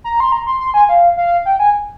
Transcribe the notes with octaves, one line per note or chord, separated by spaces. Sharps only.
A#5
C6
A#5
C6
C6
G#5
F5
F5
G5
G#5